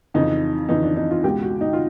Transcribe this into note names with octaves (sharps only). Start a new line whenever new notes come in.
F2 C#3 E3 D#4
F2 C#3 E3 D#4
D4
D#4
F4
C#2 B2 G#3 G4
F#4
D#4
F4